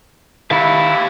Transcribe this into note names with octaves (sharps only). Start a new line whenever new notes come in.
D#3 E4 G4 F5